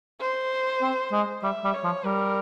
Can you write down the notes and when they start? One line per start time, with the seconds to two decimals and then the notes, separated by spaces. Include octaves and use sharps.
0.20 C5
0.82 C4
1.12 G#3
1.43 G3 E5
1.64 G3
1.74 C#5
1.84 F3
2.05 G3 A#4